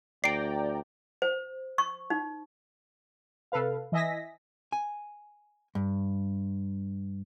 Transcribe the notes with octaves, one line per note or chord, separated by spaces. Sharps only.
D2 D5 G5 A#5 C7 D7
C5
C#6
D#4
C3 A4 B4 F5
E3 D#5 E5 G#5 A#6 B6
G#5
G2